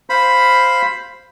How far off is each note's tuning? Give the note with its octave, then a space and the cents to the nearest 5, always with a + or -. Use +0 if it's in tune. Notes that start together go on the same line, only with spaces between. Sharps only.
C5 +0 F5 +0 B5 +5